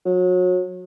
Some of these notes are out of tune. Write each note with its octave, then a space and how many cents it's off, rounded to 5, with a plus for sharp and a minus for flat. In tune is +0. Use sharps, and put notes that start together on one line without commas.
F#3 -30